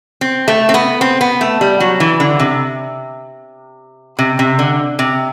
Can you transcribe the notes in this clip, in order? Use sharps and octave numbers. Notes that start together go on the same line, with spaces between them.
C4
A3
C4
B3
C4
B3
A3
G3
F#3
E3
D3
C3
C3
C3
D3
C3